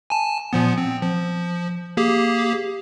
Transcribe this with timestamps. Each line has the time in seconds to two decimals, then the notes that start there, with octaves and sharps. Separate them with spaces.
0.10 G#5 A5
0.53 A#2 F3 B3
0.78 C4
1.02 F3
1.97 A#3 G4 G#4